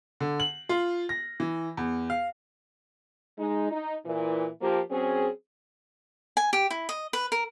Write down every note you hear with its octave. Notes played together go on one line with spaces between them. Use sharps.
D3
F#7
F4
A#6
E3
E2
F5
G#3 D#4
D#4
A#2 E3
F3 A#3 G4
F#3 C4 C#4 G#4
G#5
G4
E4
D#5
B4
A#4